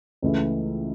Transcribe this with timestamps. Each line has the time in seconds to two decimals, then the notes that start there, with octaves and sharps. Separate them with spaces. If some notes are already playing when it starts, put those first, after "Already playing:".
0.22 C#2 C#3 E3 A3 E4